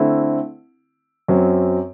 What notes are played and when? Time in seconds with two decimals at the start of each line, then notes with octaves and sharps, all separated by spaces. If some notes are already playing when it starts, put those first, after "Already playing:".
Already playing: D3 A3 C4 E4
1.28 F#2 F#3 C4